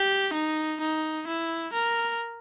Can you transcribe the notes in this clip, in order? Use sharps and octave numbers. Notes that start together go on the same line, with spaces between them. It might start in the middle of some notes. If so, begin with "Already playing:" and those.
Already playing: G4
D#4
D#4
E4
A#4